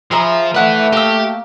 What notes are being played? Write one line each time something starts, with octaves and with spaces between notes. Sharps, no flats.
F3 G#4 E5 A#5
A3 B4 D5 E5 F#5
A#3 G4 E6